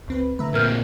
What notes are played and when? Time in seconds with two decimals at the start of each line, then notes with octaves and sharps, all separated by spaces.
0.08 D2 C4 B4
0.39 D3 A3 B4 E5 A#5
0.54 A#2 C4 A#4 F6 G6